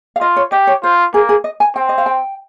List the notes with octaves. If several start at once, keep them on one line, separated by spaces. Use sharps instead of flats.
F5
F4 D#5
C#5
G4 D#5
C#5
F4 C5
A#3 G#4
G#4
D#5
G#5
C4 G5
D#5
F5
G5